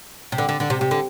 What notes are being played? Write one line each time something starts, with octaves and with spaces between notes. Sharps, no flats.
C3
D3
D3
D3
C3
C3
D3